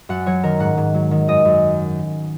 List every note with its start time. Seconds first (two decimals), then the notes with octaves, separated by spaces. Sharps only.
0.09 F#2 F#5
0.26 F#3 C#5
0.43 D#3 A#4
0.60 G#2 F#5
0.77 G#2
0.94 F#3
1.11 D#3
1.28 F#2 D#5
1.45 F#2